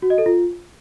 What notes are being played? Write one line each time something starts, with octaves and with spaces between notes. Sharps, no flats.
F#4
D#5
A4
F4